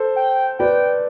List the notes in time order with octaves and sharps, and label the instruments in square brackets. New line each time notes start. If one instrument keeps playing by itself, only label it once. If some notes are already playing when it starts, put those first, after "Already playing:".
Already playing: [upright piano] A4 C5
[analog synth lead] G5
[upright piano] B4 D5 [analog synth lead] G5